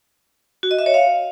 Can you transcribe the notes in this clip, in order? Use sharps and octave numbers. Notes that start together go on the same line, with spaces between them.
F#4
D#5
E5
C#5
F5